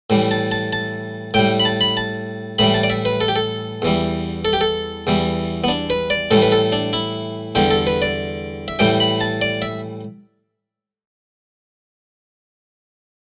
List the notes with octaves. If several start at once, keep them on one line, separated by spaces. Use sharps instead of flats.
A2 E3 G3
A5
A5
A5
A2 G3 G5
B5
A5
B5
A5
A2 E3 G3 B5
A5
D5
E5
B4
A4
G4
A4
E2 E3 G3
A4
G4
A4
E2 E3 G3
B3
D4
B4
D5
A2 E3 G3 A4
B4
A4
D4
E4
E2 D3 G3 G4
A4
B4
D5
E5
A2 E3 G3 G5
B5
A5
D5
E5